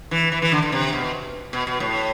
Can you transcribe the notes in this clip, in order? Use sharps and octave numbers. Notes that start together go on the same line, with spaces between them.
E3
E3
E3
D3
D3
C3
B2
B2
B2
A2